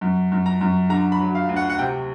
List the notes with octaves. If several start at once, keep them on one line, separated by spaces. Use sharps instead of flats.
F#2
F#2
A#5
F#2
D3 A#5
B5
F#3
F5
D2
F#5
F#5
C3 G5